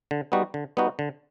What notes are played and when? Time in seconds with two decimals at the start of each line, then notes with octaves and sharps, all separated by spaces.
0.11 D3
0.32 G3 B3 D#4 F#4
0.54 D3
0.77 G3 B3 D#4 F#4
0.99 D3